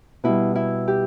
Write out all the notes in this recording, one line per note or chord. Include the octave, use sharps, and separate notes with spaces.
B2 G3 E4
E4
G4